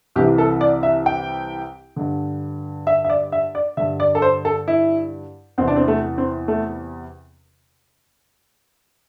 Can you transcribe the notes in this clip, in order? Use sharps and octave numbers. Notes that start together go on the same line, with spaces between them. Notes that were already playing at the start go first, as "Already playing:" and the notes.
C2 C3 E3 G4
A4
D5
E5
G5
G2 D3
E5
E5
D5
E5
D5
G2 D3 E5
D5
A4
C5
A4
E4
E2 C3 E3 C4
D4
C4
A3
C4
A3